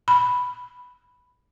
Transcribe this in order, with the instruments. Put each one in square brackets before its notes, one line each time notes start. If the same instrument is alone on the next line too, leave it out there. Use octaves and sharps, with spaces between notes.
[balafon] B5